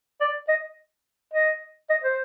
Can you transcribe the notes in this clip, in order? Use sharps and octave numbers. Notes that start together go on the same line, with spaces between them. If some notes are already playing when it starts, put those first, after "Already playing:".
D5
D#5
D#5
D#5
C5